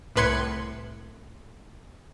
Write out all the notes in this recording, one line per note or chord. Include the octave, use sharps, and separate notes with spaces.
C2 A2 B4 C6 G#6 C#7